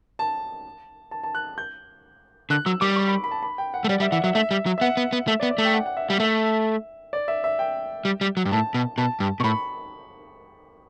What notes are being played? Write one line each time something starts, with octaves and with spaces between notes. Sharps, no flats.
A5
A5
A5
F#6
G6
D3 F#6
F#3 E6
G3 D6
C#6
B5
B5
A5
B5
G5
F#5
A3
G3 D5
G3 E5
E3 F#5
F#3 E5
A3 E5
G3
F#3
E5
B3 F#5
B3
B3
A3 E5
D5
B3
D5
A3
G5
F#5
F#5
E5
G3 E5
A3 E5
D5
E5
E5
G5
G3
G3
F#3
G2
A2 A5
B2
B2 A5
G2
B2 C#6
A2 B5